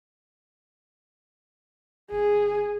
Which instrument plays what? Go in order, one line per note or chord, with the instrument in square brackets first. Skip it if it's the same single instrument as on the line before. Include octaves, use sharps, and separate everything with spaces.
[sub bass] G1 [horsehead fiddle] G#4